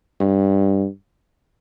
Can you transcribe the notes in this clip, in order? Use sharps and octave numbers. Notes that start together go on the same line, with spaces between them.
G2